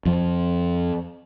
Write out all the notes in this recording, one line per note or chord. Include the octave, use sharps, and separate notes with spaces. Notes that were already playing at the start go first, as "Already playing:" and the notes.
F2 F3